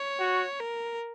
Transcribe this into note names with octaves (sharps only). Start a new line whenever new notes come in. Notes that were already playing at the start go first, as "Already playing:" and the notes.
Already playing: C#5
F#4
A#4